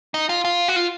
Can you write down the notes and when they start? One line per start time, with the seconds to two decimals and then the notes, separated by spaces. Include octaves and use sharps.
0.14 D#4
0.29 F4
0.45 F4
0.68 F#4
0.76 F4